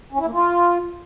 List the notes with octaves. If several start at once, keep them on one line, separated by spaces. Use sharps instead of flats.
C#4
E4
A#3
F4